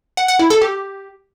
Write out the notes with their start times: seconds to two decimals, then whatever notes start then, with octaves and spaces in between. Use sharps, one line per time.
0.17 F#5
0.28 F#5
0.39 E4
0.50 A4
0.61 G4